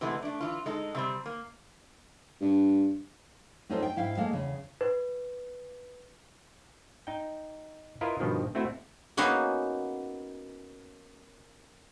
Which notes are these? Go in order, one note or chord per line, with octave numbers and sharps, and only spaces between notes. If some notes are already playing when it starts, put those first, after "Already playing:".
C3 E3 G#3 A3 B3
A3 D4
E3 F4
G#3 D#4 A4
C3 G3 C4
A#3
G2
C4 C#4 D#4 F4 A4 C5
G5
G#2 E4 F5 G5
G#3 A#3 A4 F5
E2 C#3
B4
D#4 G5
E4 F4 A#4 B4 D#5
G2 B2 D#3 F3
A3 C4 E4 F#4
A#3 B3 C#4 D#4 F#4 G#4